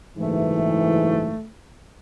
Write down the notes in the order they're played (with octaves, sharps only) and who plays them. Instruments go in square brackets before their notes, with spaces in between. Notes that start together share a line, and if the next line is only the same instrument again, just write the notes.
[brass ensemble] F#1 G#2 E3 [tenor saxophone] A3